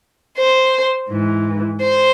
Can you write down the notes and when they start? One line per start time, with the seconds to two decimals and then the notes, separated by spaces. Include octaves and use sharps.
0.38 C5
1.10 G#2 E3
1.81 C5